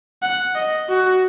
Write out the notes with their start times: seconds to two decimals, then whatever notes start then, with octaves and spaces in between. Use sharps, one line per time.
0.23 F#5
0.55 D#5
0.89 F#4